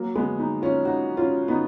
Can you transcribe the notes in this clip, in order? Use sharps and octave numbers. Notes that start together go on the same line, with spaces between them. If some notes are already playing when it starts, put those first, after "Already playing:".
Already playing: F#3 A#3
G#3 B3
B3 D#4
C#4 F4
D#4 F#4
C#4 F4
B3 D#4